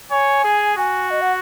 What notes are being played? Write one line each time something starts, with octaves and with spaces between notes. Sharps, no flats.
C#5 G#5
G#4
F#4 G#5
D#5
F#5